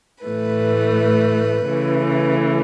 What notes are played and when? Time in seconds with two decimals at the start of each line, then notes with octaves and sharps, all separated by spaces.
0.24 A2 E3 A3 B4
1.66 C#3 E3 A3